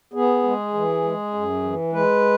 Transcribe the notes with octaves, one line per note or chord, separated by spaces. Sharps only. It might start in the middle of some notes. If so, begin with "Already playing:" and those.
B3 G#4
G#3
E3
G#3
F#2
E3
G#3 B4